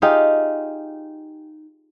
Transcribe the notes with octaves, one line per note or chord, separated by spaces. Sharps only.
D#4 F4 G4 G#4